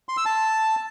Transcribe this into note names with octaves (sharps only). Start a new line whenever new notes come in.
C6
E6
A5